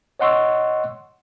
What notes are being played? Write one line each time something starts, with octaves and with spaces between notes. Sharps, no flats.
C#5 D#5 F#5 C6 C#6 E6